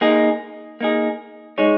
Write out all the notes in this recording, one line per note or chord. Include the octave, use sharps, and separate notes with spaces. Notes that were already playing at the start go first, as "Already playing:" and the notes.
A#3 D#4 G#4
A#3 D#4 G#4
G#3 D#4 G#4 C#5